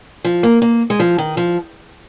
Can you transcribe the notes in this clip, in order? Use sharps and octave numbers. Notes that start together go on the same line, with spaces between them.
F3
A#3
A#3
G#3
F3
D#3
F3